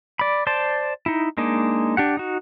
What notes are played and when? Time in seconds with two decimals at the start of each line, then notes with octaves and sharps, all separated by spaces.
0.19 D5 B5
0.47 C5 D5 A5 C6
1.06 D#4 E4
1.38 G#3 A#3 D4 D#4
1.97 D4 G4 F#5
2.17 D#4 F#4